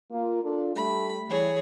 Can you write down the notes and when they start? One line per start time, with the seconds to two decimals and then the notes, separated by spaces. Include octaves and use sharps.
0.11 A#3 F4
0.44 D4 F4 A4
0.76 G3 A3 G4 B5
1.29 E3 G3 A3 E4 G#4 C#5